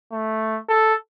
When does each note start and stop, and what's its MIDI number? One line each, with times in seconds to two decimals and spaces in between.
0.12 0.59 57
0.69 0.94 69